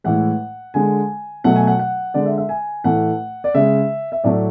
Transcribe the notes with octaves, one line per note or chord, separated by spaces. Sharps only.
A2 E3 G#3 F#5
D3 G#3 G#5
B2 F#3 A3 F#5
G#5
F#5
F#5
D3 G#3 D5
E5
E5
G#5
A2 E3 A3 F#5
D5
C#3 G#3 E5
E5
A2 F#3 A3 D5